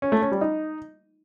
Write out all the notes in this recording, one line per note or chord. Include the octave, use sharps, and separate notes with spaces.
C#4
A3
C#4
G3
D#4